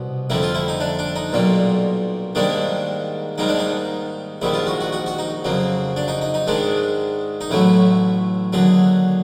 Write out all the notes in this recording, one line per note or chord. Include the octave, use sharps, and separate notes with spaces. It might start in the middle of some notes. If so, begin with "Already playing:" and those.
Already playing: C2 B2
F2 D3 G3 A#3 E4
F4
E4
D#4
D4
D4
D#4
B1 A#2 G3 A#3
G#2 D#3 G3 A#3 D4
G#2 D#3 G3 A#3 D#4
D4
D#4
A#1 G#2 D#3 G3 E4
F4
F#4
F#4
F#4
F#4
D#4
F2 C#3 F#3 A#3
D4
D#4
D#4
D#4
G#2 D#3 G#3 D4
D#4
A1 A2 F#3 A3 E4
D#2 D3 F#3 G#4